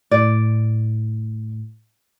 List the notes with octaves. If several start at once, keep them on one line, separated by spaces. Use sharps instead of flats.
A2 D5